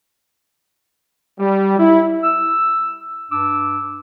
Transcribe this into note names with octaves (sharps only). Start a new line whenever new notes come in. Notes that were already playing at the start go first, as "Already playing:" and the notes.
G3
E4
E6
G2 D4 D6 E6